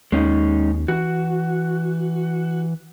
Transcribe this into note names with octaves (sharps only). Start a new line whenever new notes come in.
D#2 G#3 C#4 D#4
E3 F#4